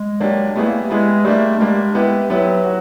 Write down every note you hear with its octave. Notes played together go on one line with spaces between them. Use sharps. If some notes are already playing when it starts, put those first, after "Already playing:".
Already playing: G#3
F#3 A#3 D4 G4
G3 A3 B3 E4 G#4
A#3
G3 G#3 B3 E4 G#4
G3 A3 A#3 D4
G3 G#3 A#3 D4
B3 E4 G4 B4
F#3 B3 E4 G4 B4
F#4